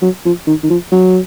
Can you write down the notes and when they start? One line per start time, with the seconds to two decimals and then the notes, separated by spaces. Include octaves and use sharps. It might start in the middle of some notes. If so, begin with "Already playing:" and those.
0.02 F#3
0.25 F3
0.47 D#3
0.64 D#3
0.70 F3
0.92 F#3